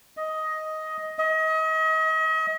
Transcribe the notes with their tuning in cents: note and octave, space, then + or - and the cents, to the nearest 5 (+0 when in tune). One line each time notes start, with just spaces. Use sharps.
D#5 +10
D#5 +35